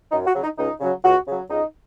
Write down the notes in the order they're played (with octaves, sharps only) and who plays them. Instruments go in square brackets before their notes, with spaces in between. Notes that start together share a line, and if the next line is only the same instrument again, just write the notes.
[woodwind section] F#2 D#4
F#4
C#3 F#3
D#4
C#2 D#4
C#3 F#3
C#2 F#4
C#3 F#3
C#2 D#4